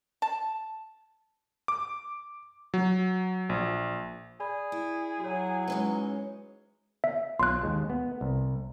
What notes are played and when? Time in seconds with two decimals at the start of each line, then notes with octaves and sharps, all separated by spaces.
0.22 A5
1.68 D6
2.74 F#3
3.49 A#1
4.40 G#4 D5 B5
4.72 E4
5.20 F#3 F#4 C#5
5.68 E3 G#3 C#4 D#4
7.04 E5
7.39 B1 F4 C#5 C6 F#6
7.61 D#2 G#3 A5
7.90 B3
8.21 C2